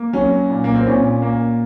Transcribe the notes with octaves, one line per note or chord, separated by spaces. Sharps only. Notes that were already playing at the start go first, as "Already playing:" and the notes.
Already playing: A#3
F#3 C#4
A#2
A#3
C4
A#2 C#4
A#3